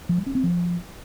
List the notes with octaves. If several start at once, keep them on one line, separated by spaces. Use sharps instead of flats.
F3
G3
C#4
C4
F3